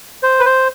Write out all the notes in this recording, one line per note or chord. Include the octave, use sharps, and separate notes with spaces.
C5
B4
C5